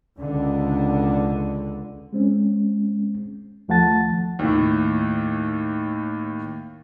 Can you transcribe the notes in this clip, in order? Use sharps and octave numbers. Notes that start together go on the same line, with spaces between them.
C#2 D3
G#3 C4 C#4
D#2 F3 A3 F#5 A5 A6
D#2 A2